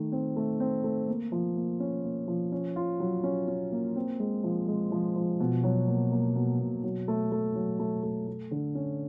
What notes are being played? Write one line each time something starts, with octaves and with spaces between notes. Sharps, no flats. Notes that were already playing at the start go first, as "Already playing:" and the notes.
Already playing: D#3 A3
C4
A3
C4
A3
A#3
F3
A#3
C#4
A#3
F3
C#4
F4
F#3
C#4
C#4
A#3
C4
G#3
F3
G#3
F3
F3
B2
F#3
A#3
A#3
B2
B2
F#3
A3
A3
F#3
A3
A3
A3
D3
C#4